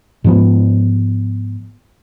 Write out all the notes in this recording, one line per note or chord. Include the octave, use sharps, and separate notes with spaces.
G#2 F3 B3